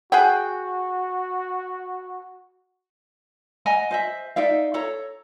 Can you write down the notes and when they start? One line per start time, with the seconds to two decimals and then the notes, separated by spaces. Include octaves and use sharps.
0.12 F#4 G#4 F#5 G5
3.66 D#5 F#5 G#5 A#5
3.91 C5 D#5 E5
4.36 D#4 D5 E5 F5
4.74 A4 C#5 A#5